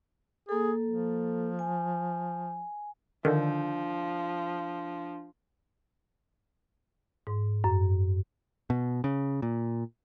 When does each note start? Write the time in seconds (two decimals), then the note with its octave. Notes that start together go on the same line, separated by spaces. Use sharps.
0.49 A#3 G#4 A4
0.86 F3
1.59 G#5
3.25 D3 D#3 F3 D4
7.27 G#2
7.64 F#2
8.70 B2
9.04 C#3
9.42 A#2